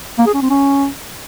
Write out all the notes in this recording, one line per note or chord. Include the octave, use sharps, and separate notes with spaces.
A#3
G#4
C#4
C4
C#4